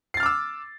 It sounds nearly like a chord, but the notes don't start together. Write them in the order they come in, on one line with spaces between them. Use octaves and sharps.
C7 A6 F6 D6 E6